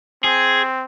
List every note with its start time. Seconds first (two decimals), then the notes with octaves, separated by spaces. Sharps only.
0.24 C4 G#4